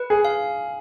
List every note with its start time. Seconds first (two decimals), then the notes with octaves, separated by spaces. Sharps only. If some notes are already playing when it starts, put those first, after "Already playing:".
Already playing: B4
0.10 G#4
0.25 F5